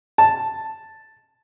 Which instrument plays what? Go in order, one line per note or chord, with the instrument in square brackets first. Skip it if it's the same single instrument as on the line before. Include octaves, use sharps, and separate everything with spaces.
[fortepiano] A5